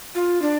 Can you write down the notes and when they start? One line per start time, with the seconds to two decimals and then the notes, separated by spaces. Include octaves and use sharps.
0.15 F4
0.42 D4